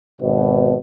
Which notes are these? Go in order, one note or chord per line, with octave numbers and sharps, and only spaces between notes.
G#1 B2